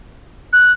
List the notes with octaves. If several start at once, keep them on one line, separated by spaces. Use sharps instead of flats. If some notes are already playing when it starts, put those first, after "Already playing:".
F#6